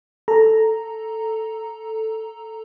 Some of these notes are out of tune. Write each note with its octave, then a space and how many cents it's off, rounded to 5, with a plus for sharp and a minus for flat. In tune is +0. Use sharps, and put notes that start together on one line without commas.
A4 +0 A#5 +0